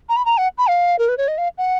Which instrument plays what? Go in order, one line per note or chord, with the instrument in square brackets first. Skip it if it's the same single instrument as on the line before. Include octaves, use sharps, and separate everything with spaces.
[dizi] A#5
B5
A#5
F#5
B5
F5
A#4
B4
C#5
D#5
F5
F#5